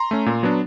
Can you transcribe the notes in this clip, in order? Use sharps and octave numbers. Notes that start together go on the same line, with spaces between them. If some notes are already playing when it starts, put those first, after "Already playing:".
Already playing: A#5 C6
A3 C#4
A#2
F#3 B3 D4